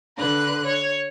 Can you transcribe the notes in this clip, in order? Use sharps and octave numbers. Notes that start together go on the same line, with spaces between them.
D3 B4 F#6
C#5